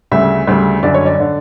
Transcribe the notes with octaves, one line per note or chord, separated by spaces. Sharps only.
D2 C#3 G3 E5
D2 C#3 G3
F#1 F#2 D3 D5
C#5
D5
D3